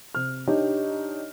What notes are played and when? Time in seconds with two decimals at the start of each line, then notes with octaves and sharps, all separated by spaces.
0.15 C3 F6
0.47 D4 D#4 G4 C#5